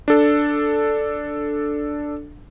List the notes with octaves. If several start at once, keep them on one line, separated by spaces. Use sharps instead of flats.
D4 A4